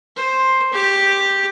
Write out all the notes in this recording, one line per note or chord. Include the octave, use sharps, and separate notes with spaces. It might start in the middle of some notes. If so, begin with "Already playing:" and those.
C5
G4